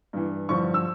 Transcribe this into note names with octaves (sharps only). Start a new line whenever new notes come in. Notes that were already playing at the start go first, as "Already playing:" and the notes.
G2 E3
G2 D3 F3 C#6
E6